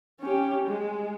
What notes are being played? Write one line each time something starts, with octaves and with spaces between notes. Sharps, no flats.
C#4 G4
G#3